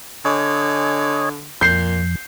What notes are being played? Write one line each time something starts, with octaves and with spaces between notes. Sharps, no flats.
D3 C#5 D#5 G#5
F2 A#2 G6 C7